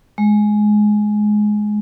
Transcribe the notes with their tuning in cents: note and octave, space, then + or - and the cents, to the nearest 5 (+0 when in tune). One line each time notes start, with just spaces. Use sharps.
G#3 +15